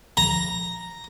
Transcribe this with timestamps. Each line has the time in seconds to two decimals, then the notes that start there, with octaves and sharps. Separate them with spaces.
0.17 A#5